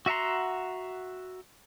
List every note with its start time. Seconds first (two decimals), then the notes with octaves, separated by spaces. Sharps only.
0.06 F#4 E5 F#5 A#5 C6